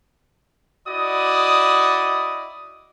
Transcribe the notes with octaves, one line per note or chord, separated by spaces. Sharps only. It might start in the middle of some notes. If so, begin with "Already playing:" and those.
E4 F#4 D5 D#5 D#6